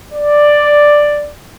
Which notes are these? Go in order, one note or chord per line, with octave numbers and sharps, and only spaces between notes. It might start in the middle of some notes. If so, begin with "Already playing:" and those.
D5